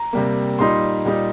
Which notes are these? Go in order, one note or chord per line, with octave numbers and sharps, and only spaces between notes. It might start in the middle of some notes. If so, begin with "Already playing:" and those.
Already playing: A#5
C3 G3 A#3
A#2 G3 D#4 C6
A#2 G3 D#4